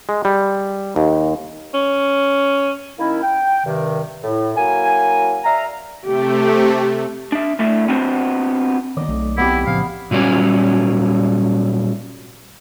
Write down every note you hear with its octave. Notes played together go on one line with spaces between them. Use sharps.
G#3
G3
D#2
C#4
D#3 A#3 C#4 E4
G5
G2 C3 D#3
A2
F#3 A#3 E4 G#5
D5 E5 F5 A#5
C3 A3 G4
D4 E5
A2 A3 D4 A4 E5
B3 C4 D4 F#4 C5
D#3 B3 D5 D#5 D#6
B1 A3
D2 G#3 B3 C4 E4 G4
A2 C#3 F3 F5
A#2 F#3 G3 C#4